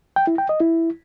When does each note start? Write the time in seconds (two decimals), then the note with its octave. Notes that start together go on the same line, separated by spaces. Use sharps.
0.16 G5
0.27 E4
0.38 G5
0.49 D#5
0.60 E4